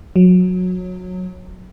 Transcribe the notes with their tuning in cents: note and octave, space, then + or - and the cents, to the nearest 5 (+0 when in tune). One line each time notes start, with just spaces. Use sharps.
F#3 -20